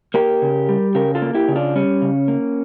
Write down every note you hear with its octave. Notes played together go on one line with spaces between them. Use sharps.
A#3 G4 A#4
C#3
G3
C#3 G4 A#4
F4 A4
A#3
E4 G4
C#3
D4 F4
G3 C#4
C#3
A#3